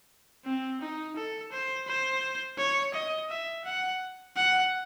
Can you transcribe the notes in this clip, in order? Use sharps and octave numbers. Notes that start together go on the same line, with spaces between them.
C4
D#4
A4
C5
C5
C#5
D#5
E5
F#5
F#5